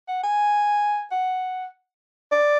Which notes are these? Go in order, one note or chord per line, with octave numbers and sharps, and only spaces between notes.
F#5
G#5
F#5
D5